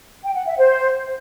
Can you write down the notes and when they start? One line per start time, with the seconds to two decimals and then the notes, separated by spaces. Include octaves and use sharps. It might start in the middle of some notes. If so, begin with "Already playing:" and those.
0.24 G5
0.35 F#5
0.46 E5
0.57 C5